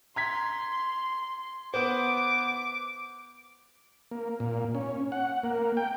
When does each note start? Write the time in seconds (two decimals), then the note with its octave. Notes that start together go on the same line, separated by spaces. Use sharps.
0.16 A#5 C6 G#6 B6
1.74 B3 B4 C5 D6
4.11 A#3
4.40 A#2
4.75 C#4
5.12 F#5
5.44 A#3
5.77 G5